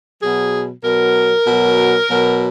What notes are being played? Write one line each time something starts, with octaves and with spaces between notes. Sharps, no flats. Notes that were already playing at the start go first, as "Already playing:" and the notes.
B2 F#3 G#4
B2 F#3 A#4
B2 F#3
B2 F#3